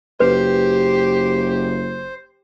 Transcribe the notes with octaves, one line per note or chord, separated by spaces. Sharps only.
F#1 G4 B4 C5